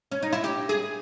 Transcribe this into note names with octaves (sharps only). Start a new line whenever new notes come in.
C#4
D#4
E4
G4
G#4